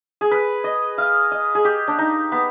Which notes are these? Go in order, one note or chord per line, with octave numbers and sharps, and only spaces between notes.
G#4
B4
D#5
F5
D#5
G#4
G4
D4
D#4
B3